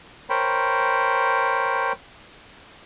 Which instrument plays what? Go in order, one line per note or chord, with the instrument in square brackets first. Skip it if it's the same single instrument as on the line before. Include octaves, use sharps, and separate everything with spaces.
[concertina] A#4 C5 C#5 G5 B5